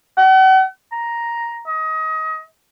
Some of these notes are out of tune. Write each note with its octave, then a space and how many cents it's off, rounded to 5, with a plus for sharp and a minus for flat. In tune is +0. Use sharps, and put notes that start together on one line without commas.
F#5 +40
A#5 +5
D#5 +25